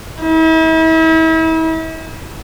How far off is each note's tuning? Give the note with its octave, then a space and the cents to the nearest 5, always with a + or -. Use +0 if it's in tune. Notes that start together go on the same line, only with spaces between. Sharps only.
E4 -40